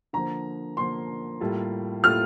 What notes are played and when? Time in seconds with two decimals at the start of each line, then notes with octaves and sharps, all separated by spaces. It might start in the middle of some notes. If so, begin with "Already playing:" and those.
0.13 D3 F3 A#3 A#5
0.77 D3 F3 A#3 C6
1.40 A2 G3 A#3 F4 A4
2.03 A2 G3 A#3 F4 A4 F6